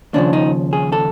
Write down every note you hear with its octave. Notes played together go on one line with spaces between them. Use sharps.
D#2 C#3 F3 D4
D#4
G#4
A4